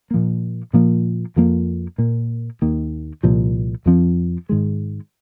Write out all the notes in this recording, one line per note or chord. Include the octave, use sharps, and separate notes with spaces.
A#2 F3 A#3
A#2 F3 A#3
F2 F3 A#3
A#2 A#3
D#2 D#3 A#3
C2 A#2 F3
F2 F3 C4
G#2 D#3 G#3